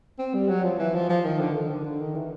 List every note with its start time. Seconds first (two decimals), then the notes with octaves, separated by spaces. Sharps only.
0.19 C4
0.34 G3
0.49 F#3
0.64 F3
0.79 E3
0.94 F3
1.09 F3
1.24 D#3
1.39 D3
1.54 D#3
1.70 D3
1.84 D3
2.00 D#3
2.15 E3